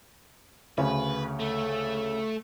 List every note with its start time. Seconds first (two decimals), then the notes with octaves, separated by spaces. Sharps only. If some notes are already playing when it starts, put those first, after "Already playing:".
0.78 D2 C#3 C#4 B4
1.40 A3